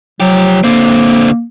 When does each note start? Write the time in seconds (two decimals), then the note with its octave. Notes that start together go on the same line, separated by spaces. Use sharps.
0.20 F3 F#3 G4
0.64 D3 A#3 C4